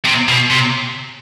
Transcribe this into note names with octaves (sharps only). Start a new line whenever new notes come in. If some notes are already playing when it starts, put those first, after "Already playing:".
C3
B2
C3